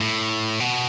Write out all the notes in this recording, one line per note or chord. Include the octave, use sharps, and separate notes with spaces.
A2
B2